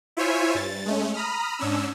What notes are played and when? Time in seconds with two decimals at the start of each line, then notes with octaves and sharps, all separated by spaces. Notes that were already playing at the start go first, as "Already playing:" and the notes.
0.17 E4 F4 C5 C#5 E5 G#5
0.55 G2 A6
0.86 G#3 A3 C#4
1.14 A#5 B5 D#6 F6
1.58 G#2 C#4 D4 E6